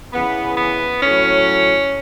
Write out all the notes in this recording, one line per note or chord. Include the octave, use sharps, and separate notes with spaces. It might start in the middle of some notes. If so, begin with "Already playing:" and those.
C#3 E3 B3
B3
A2 F#3 C#4